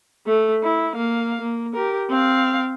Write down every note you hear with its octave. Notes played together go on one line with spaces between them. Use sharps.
A3
E4
A#3 F5
A#3
G4 A#4
C4 F5